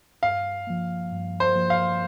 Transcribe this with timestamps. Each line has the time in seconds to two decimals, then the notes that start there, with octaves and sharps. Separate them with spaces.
0.23 G2 F5
0.67 F3 A#3
1.12 G2
1.40 C5
1.55 F3 A#3
1.70 F5